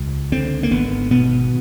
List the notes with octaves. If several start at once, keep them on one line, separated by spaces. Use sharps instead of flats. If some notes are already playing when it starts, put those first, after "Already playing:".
Already playing: C#2
D3 C4
A#3
G#1 B3
B2 B3